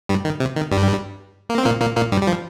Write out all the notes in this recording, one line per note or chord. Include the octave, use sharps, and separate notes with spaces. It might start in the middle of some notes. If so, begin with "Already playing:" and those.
G2 G3
D#3
C3
D#3
G2 G3
A#3
C4
A#2 A#3
A#2 A#3
A#2 A#3
G2 G3
G3
F3